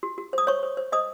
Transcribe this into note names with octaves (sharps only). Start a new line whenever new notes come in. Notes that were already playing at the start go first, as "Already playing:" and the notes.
F#4
F#4
C5 D#6
C5 C#5 C#6
C5
C5
C5 D#5 D#6